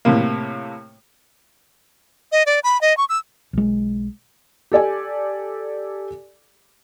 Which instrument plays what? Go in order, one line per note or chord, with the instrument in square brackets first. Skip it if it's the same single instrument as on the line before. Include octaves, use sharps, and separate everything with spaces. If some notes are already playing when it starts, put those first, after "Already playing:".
[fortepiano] A2 C3 A#3
[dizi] D#5
D5
B5
D#5
C#6
E6
[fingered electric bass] B1 G#3
[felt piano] G4 A4 D5 G#5